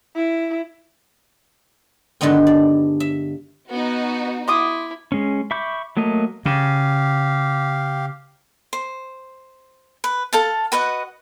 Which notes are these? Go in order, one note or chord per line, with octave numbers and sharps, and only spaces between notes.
E4
G2 D3 D#3 G#3 B3 G5
D5
E5
B3 D#4 F#4
E4 C6 D6 D#6
G#3 C#4
E5 B5 C#6 D6 G6
F#3 A3 A#3 D#5
C#3 G4 F5
C5
B4
A4 F5 A5
F#4 B4 D#5 F#5